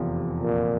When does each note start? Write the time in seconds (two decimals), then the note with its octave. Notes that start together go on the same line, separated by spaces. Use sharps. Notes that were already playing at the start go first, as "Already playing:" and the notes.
Already playing: F1 E2 C3 F3
0.42 A#2